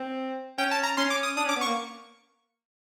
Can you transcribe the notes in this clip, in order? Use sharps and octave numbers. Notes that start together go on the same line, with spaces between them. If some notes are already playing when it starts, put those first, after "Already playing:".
Already playing: C4
C#4 G5
A5
A#5
C#4 C6
D6
D#6
D4 D#6
C#4
D6
B3
C#6
A#3